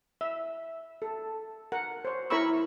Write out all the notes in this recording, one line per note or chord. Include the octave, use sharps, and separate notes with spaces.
E5
A4
A#4 F#5
C5 C#5
E4 A#4 C#5 B5 C#6 E6